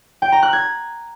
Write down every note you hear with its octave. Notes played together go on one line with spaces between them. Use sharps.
G5
A#5
F#6
G#6